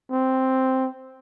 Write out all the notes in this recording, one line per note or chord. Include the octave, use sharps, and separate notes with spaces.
C4